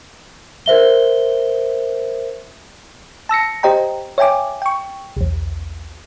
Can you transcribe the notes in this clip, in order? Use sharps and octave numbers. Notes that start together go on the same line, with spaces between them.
A#4 C5 E5 G7
A5 E6 A#6 C#7
G4 C5 D#5 G5 A#5
C#5 E5 G5 G#5 D6
G5 C#6
B1 E2